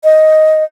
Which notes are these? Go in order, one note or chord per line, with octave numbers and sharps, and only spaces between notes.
D#5